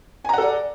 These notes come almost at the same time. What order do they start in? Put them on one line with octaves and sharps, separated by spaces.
G#5 A#5 F#5 A4 D5